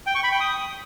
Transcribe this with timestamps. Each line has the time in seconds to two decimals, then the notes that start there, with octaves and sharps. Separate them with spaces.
0.06 G5
0.15 C#6
0.23 B5
0.32 G5
0.40 D#6